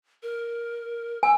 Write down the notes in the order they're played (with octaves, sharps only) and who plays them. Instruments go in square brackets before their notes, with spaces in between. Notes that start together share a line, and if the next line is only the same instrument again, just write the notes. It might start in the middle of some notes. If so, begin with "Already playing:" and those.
[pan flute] A#4
[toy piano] G#5 [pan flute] E6